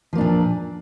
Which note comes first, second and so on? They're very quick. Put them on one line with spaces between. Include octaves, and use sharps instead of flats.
F3 A#3 D4 A#2